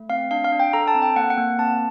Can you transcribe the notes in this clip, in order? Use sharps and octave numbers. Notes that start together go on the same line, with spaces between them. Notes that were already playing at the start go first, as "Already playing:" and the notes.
Already playing: A3
C4 F5
D4 F5
F5
D4
G5
A4 A#5
A5
C4
G5
A#3 F#5
F#5
A#3
C4 A5